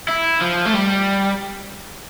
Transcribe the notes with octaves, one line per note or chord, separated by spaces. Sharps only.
E4
F3
A3
G3